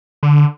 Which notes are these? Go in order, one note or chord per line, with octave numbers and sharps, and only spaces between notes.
D3